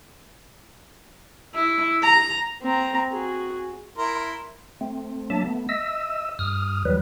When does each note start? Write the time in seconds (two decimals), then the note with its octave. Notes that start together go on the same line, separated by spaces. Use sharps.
1.55 E4
2.03 A#5
2.62 C4 A#5
3.11 F#4 G#4
3.98 E4 A#4 C6
4.81 A3 C4
5.30 F#3 A#3 D4 E5 A5
5.45 A3 B3
5.69 D#5 E5 E6
6.39 G2 D#6 F6
6.85 D#2 E3 F#3 G3 B4